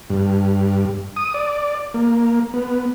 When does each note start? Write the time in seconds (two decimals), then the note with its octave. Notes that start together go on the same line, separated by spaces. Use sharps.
0.10 G2
1.16 D#6
1.34 D5
1.94 A#3
2.54 B3